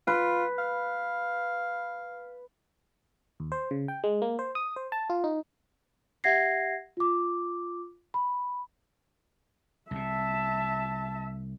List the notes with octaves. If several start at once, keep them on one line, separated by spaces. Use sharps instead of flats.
F4 B4
F5
D#2
C5
C#3
G5
G#3
A#3
C5
D#6
C5
A5
F4
D#4
G4 E5 F#5 G#6 A#6 C7
F4 D6
B5
C2 C3 E5 A5